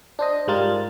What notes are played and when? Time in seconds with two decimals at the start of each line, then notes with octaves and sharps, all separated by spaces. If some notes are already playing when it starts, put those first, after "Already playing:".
0.19 D4 C5 D#5
0.48 G#2 G3 F4 A#4 A6